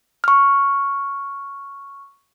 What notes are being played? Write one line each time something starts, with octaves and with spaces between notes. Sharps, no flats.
C#6 F6